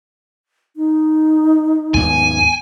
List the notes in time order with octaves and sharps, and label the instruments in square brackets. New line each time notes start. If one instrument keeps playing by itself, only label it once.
[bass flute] D#4
[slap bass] D#2 G#2 B3 [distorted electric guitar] G#5